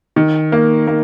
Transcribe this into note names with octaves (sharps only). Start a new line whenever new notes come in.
D#3
A#3
A#3